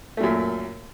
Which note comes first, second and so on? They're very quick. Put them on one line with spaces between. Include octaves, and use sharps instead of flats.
A3 A#2 F#2